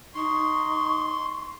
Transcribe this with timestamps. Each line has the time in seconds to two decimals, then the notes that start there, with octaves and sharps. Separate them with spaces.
0.15 D#4 C6 C#6